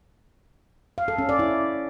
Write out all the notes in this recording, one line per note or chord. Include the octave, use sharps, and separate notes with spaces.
F5
A4
C#4
D5
E4